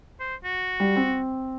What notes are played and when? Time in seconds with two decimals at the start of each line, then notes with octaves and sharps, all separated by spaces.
0.20 C5
0.44 F#4
0.80 G3
0.96 C4